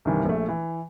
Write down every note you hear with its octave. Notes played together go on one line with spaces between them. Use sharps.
C2 G2 C3 D#3 E3
A#1 A3
E3